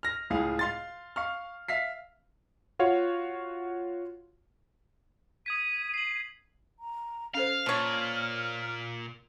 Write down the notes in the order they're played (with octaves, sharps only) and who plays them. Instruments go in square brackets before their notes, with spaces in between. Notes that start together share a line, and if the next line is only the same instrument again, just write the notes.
[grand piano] F6 A#6
C#2 A2 G#4 F5
F5 C6 A6
F5 C#6 F6
E5 F5 B6 C7
[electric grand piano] F4 F#4 C#5 F5 F#5
[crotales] D#6 G#6 B6 [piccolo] D#7
[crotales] C7 F#7
[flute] A#5
[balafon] C#4 A4 C5 [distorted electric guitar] F5 [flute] F6
[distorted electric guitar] A#2 [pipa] F3 C#5